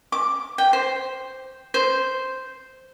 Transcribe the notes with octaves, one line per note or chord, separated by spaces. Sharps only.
D6
G5
C5
C5